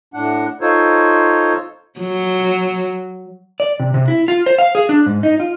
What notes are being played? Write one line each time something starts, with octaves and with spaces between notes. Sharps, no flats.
A2 D4 F#5
D#4 F4 A4 C5 C#5
F#3
D5
C3
C3
E4
F4
C5
F5
G#4
D4
G#2
D#4
F4